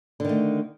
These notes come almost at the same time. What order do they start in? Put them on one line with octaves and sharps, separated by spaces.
D3 D#3 A3